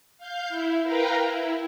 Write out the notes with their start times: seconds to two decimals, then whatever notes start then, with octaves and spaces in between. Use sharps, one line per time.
0.18 F5 G6
0.49 E4
0.84 A#4 B4 F5 G5 A#5
1.20 E4